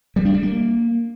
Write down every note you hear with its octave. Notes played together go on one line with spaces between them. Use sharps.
G3
D4
G3
A#3